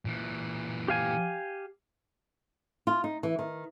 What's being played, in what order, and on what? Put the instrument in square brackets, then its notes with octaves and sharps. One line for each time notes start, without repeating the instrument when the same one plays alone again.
[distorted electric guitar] A#2 E3
[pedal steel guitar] G4 F5 G#5
[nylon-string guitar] F4
D#4
E3
D#3